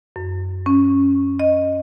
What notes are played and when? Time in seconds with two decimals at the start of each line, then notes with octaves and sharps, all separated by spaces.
0.16 F#2
0.66 C#4
1.40 D#5